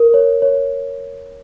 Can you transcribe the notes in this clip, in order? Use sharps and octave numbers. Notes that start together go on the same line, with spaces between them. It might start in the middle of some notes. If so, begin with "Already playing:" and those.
Already playing: A#4
C#5
C#5